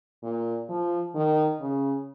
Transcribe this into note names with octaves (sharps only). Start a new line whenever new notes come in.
A#2
F3
D#3
C#3